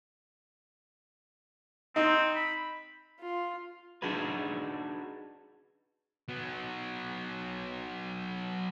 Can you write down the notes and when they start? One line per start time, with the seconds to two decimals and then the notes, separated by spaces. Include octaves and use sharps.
1.96 C4 D#4
2.36 B5
3.20 F4
4.02 D4 D#4 F#4 G#4 B4
6.28 F#3 B3